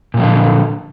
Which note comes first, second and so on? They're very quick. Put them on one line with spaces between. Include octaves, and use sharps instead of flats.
A#2 F#3 F3 D3